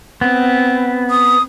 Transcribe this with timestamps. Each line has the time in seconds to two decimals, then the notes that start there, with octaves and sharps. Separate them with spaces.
0.21 B3 C4
1.10 D#6